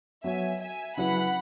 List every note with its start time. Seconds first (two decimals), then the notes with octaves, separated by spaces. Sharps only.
0.24 F#3 B3 F#4 C#5 E5 G#5
0.60 E5 G#5
0.97 C#3 F#3 E4 G#4 B4 F#5 B5